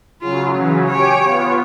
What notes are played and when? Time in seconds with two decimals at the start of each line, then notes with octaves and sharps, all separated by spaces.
0.22 C#3 F#3 F4
0.59 E3
0.91 G4 C#5 G#5 D7
1.24 B3 F4